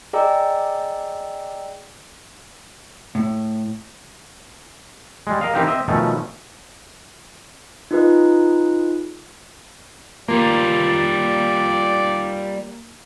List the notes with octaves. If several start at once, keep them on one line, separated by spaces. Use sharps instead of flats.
G#4 D5 D#5 G5 A#5 E6
A2
G3 G#3
A#4 D#5 F5
E3 C4 D#4 G4 A#4
C4 D#5 E5
B2 D#3 F3 A3 C#4
D#4 F4 G#4 B4 D#5
G3 A#3 F4 D5